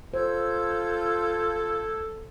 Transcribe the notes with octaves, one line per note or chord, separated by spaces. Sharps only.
F4 A4 C5 E6 G6 G#6